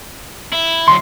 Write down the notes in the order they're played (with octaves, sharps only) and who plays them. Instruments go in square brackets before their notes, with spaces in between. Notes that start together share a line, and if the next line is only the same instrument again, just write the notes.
[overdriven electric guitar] E4
[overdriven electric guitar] D2 F#3 [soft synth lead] C6